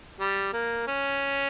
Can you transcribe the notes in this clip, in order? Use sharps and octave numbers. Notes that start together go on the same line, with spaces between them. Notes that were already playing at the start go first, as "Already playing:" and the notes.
G3
A#3
C#4